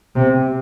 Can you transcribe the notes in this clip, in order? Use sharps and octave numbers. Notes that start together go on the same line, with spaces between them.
C3